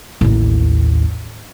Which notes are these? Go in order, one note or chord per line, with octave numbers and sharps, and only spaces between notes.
A1 D#2